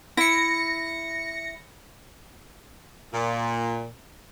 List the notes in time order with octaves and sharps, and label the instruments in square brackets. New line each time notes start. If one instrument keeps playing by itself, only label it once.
[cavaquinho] E4 [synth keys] A#6 C#7
[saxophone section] A#2